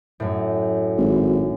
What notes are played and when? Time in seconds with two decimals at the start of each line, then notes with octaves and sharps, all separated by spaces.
0.20 F#2 A2
0.98 G#1